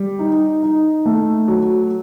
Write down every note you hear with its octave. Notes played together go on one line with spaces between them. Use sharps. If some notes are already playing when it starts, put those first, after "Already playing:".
Already playing: G3
D#4
D#4
A3
F#3